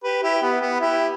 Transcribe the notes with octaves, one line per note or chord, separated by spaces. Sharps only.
G4 B4
E4 G4
B3
B3
E4 G4